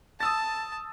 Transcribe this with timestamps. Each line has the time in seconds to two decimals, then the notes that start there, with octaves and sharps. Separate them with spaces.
0.20 A5 D#6 E6 A6